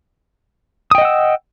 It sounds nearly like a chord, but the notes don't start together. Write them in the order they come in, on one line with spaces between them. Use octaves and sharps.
D#6 G5 D#5 F#5 E6